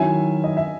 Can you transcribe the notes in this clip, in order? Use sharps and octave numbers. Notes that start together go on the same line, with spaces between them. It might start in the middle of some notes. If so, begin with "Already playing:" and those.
Already playing: D#3 F#3 C#4 E4 E5 G#5
D#5
E5